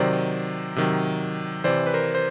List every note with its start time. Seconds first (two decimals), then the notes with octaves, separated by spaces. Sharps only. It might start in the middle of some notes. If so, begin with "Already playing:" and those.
Already playing: C3 D#3 F#3 C5 D5
0.76 C3 D#3 F#3
1.64 C3 E3 C5 D5
1.87 B4
1.94 A#4 C5
2.15 C5